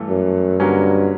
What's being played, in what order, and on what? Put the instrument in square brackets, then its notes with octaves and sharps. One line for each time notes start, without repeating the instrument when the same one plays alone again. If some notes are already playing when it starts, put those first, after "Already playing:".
Already playing: [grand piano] G2 E3 A3
[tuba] F#2
[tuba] G2 [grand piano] D3 F#3 A#3 C#4